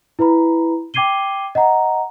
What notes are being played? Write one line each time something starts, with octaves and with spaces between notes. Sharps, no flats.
E4 B4 A#5 B5
G5 D6 G#6 C7 D#7 G7
D#5 F#5 A#5